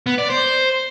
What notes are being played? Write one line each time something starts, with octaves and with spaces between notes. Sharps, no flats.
B3
D5
C5